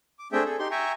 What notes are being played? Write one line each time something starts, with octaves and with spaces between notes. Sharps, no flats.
D6
A3 C4 D4 G#4 E5 G5
G#4 A4
D#4 G4 C6
E5 G5 G#5 A#5 C#6